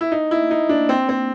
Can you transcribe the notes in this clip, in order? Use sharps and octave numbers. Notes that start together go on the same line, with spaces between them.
E4
D#4
E4
D#4
D4
C4
C4